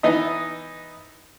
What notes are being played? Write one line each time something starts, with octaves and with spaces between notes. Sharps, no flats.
E3 B3 D#4 E4 D#5